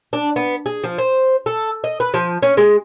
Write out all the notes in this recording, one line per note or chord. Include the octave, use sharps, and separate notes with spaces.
D4
B3
G#4
F3
C5
A4
D#5
B4
F3
C#4
G#3